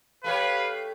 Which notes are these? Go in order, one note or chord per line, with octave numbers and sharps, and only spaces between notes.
A3 G4 B4 C#5 F5